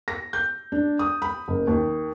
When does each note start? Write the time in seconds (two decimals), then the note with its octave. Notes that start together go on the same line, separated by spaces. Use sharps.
0.08 A#6
0.33 G6
0.72 D4
0.99 D#6
1.22 B5
1.48 F#1
1.67 D#2